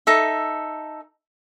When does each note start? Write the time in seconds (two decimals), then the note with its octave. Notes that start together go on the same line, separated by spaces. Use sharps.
0.07 D#4 A4 E5